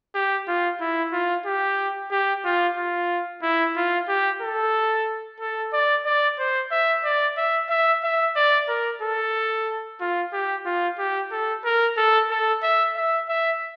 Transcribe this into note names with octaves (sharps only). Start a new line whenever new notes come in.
G4
F4
E4
F4
G4
G4
F4
F4
E4
F4
G4
A4
A4
D5
D5
C5
E5
D5
E5
E5
E5
D5
A#4
A4
F4
G4
F4
G4
A4
A#4
A4
A4
E5
E5
E5